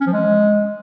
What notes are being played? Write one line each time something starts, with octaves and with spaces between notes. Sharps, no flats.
C#4
F3
G#3